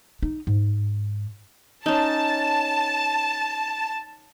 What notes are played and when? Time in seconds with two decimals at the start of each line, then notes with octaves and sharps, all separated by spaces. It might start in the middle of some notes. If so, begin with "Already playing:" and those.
0.23 D#4
0.47 G#2
1.86 C#4 D#4 A5